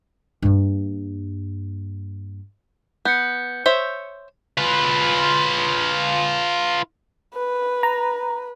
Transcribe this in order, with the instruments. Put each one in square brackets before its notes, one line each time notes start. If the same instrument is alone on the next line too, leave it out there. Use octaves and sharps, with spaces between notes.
[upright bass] G2 A#3
[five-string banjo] B3 [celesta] G6 C#7
[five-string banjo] C5 C#5 E5
[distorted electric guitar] F4 B4
[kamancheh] B4
[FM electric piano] A#5